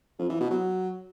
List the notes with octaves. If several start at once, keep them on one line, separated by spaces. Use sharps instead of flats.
F2
E3
B2
F#3